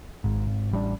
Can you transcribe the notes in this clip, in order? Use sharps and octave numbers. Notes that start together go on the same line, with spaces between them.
G#1 G#2
G#1
A1 G3 D4